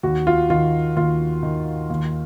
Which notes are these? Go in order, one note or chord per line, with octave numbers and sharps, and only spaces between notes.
D#2 F#4
F4
D#3 F4
D#2 F4
D#3
D#2